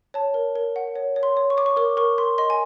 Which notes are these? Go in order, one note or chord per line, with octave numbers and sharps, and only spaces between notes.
C#5 A5
A#4
A#4
F#5
C#5
C#5
C6
C#5
C#6
C#5 D6
C#6
A#4 D6
A#4 C#6
A#4 C6
D#5 C6
G#5